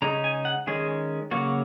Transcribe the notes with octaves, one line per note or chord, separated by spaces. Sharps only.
C#3 G#3 D#4 A#5
G#5
F#5
D#3 G#3 C#4 G#4
C#3 F#3 A#3 F#4